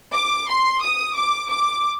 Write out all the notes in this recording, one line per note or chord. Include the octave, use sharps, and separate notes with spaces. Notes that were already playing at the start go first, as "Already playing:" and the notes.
D6
C6
D#6
D6
D6